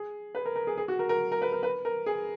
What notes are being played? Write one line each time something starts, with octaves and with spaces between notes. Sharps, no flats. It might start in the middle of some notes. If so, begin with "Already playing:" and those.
Already playing: G#4
B4
A#4
A#4
G#4
G#4
F#4
A#4
A#4
A#4
B4
A#4
B4
A#4
G#4